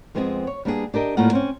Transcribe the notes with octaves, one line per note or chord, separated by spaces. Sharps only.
F2 G#3 B3 C4 E4 G#4
C#5
G3 A#3 B3 D4 D#4 G#4
D4 G4 A#4 D#5
A2 G3 A#3 F4 F#5
C4 C#4